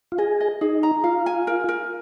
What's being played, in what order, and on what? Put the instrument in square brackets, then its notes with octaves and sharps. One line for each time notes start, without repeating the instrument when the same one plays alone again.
[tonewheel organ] F4
[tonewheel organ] G#4 [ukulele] D#5
[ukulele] D#5
[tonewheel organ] D#4 [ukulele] G#4
[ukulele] A#5
[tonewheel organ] F4 [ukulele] F5
[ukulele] G#5
A#4
A#4